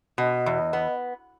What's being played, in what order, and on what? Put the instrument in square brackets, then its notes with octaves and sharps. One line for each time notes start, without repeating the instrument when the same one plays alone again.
[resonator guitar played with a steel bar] B2 [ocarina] D#5
[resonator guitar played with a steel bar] E2
B3